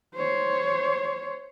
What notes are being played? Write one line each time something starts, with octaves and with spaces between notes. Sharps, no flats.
C5 C#5